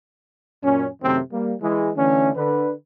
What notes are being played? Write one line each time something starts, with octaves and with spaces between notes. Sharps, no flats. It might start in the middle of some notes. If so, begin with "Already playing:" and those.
F#2 A#2 C#4
F#2 C3 D#3 A3 C4
G3 A#3
E3 G#3
D3 E3 A3 C#4
D3 B4